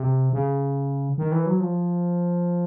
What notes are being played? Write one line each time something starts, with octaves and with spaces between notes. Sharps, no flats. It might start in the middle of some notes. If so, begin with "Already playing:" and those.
Already playing: C3
C#3
D#3
E3
F#3
F3